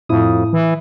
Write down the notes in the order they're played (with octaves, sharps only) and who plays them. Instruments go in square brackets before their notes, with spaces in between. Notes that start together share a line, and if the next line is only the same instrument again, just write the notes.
[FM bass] F2 [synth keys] A2 E4 D#6
[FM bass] E3